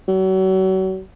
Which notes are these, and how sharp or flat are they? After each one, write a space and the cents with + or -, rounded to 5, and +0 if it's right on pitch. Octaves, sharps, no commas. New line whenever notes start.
F#3 +35